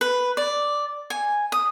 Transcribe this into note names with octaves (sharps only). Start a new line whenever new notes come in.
B4
D5
G#5
D#6